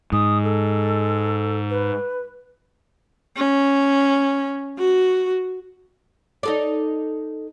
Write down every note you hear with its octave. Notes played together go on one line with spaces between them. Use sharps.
G#2 D#6
A4
B4
C#4
F#4
D#4 A4 D5